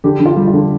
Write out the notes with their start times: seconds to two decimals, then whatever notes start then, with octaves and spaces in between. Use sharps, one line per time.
0.04 D3 G4
0.20 D3
0.26 F4
0.37 G3
0.48 F4
0.53 D3